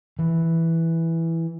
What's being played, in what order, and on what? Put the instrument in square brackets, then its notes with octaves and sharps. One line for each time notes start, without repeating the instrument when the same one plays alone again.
[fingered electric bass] E3